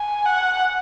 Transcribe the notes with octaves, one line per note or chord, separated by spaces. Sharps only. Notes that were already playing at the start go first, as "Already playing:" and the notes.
Already playing: G#5
F#5